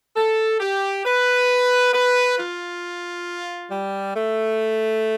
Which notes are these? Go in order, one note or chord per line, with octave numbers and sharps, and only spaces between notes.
A4
G4
B4
B4
F4
G3
A3